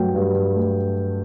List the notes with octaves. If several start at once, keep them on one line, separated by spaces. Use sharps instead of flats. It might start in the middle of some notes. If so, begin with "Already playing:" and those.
Already playing: G2 F#3 A3 G5
G2
F#3
A3